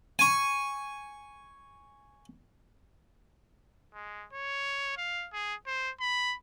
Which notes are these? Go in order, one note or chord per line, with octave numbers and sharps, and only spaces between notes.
G#5 C#6
G#3
C#5
F5
G#4
C5
B5